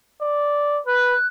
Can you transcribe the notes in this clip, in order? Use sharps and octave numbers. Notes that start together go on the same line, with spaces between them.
D5
B4 F#6